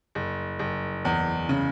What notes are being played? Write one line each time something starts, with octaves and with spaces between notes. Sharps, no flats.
F#1
F#1
E2
C#3